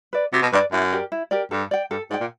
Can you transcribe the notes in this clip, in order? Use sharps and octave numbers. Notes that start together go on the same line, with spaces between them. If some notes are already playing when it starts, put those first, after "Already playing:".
B4 D5
C3 F#4
B2
G2 B4 D5
F#2 E4
G4 A#4 D5
E4
G4 A#4 D5
G2 A4
D5 G5
G2 A4
G#2 D5 G5
A#2